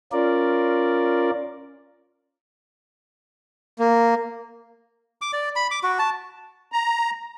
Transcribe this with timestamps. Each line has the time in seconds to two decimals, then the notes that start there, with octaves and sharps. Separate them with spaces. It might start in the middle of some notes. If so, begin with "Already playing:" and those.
0.12 C#4 F4 A#4 D5
3.79 A#3
5.22 D6
5.33 D5
5.56 B5
5.71 D6
5.83 F#4
5.99 A5
6.72 A#5